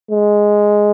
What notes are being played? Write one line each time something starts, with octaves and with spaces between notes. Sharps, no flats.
G#3